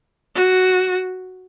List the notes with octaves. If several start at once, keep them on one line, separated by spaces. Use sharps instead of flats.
F#4